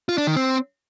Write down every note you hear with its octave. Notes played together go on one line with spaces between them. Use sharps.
F4
D4
D#3
C4